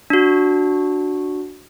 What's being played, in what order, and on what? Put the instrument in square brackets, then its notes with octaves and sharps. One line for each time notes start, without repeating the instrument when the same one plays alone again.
[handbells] D4 F#4